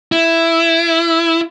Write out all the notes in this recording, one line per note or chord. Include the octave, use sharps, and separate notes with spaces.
E4